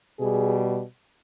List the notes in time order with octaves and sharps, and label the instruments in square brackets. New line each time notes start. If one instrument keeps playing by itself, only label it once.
[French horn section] B2 G3 G#4